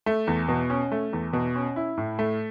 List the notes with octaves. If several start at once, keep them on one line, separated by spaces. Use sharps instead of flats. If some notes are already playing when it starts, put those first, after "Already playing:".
A3
E2
B2
C#4
A3
E2
B2
C#4
E4
A2
A3